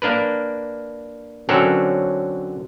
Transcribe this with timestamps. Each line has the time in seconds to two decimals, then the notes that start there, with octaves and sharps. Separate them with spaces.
0.02 A#3 D4 A#4 B4
1.49 D3 F#3 C4 C#4 A4 A#4